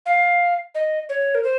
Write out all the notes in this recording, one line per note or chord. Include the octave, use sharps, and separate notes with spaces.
F5
D#5
C#5
A#4
C5